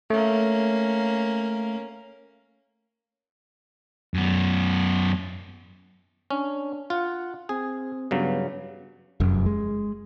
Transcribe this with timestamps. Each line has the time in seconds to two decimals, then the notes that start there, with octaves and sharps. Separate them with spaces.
0.10 A3 A#3 C#4
4.14 F#2 B3
6.31 C#4 D4
6.90 F4 F#5
7.49 C4 G#4
8.11 G2 C#3 F#3 B3
9.20 F1 F#2
9.46 G#3